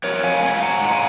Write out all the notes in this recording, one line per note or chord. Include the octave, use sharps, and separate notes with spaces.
F2 A#4 C#5
F2 F5 G#5
G#3 F5 G#5
G#2 F#5 A#5
G#2
F5 G#5